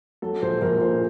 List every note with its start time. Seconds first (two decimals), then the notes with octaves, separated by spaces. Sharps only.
0.22 F#3 A4
0.42 A#1 C5
0.61 A#1 A#4
0.81 A#2 C5